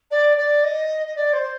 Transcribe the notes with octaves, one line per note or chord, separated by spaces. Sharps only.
D5
D5
D#5
D#5
D5
C5